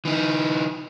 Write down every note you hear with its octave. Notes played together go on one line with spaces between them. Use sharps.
E3 D#4